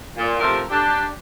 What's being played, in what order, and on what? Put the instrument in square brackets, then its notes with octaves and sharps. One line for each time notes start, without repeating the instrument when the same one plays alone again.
[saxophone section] A#2
C3 F3 A3 G4 A#4
D4 G4